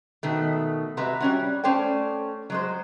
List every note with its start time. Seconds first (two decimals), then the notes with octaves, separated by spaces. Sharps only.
0.23 B2 D#3 A3
0.97 C3 G#3 F#4 B4 E5 A#5
1.20 G3 C#4 F#4
1.64 A3 C#4 C5 D5 G5
2.50 F#3 G#3 C5